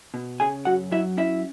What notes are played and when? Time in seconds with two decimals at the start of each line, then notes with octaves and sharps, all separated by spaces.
0.14 B2
0.40 C#3 G#4 G#5
0.65 F#2 F#4 F#5
0.91 F#3 E4 E5
1.17 C#4 E4 E5